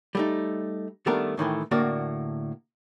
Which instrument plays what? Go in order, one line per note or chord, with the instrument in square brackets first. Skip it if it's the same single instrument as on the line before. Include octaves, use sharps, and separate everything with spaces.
[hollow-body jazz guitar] G3 A3 D#4
D#3 G3 A3 B3 D4 A#4
A2 D#3 E3 A3
A2 D3 A#3 F#4 D5